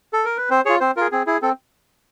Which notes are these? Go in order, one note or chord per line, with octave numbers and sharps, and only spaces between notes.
A4
A#4
B4
C4 C5
F4 G#4 C#5
C4 C5
F4 G#4 A#4
C4 G#4
E4 G#4
C4 A4